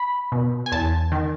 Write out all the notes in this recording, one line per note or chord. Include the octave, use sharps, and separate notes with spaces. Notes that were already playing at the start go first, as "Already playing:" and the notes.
Already playing: B5
B2
G#5
E2 A5
D#3